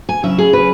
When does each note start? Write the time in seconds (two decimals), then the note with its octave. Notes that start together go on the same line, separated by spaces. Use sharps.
0.09 G#5
0.23 C#3 F#3 C#4 E4 E5
0.38 G#4
0.53 B4